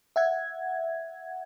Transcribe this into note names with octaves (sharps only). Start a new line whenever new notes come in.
E5 F#5 G#6